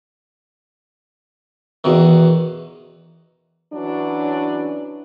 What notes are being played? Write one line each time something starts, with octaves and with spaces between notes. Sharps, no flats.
E2 B2 D#3
E3 F#3 C#4 D4